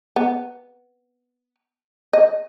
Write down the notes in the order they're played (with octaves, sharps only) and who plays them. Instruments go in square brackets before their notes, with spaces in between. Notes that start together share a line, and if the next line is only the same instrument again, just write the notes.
[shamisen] B3
D#5